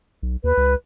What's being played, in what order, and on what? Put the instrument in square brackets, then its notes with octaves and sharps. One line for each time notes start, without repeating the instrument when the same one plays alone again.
[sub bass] B1
[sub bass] D#2 [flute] B4
[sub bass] C#2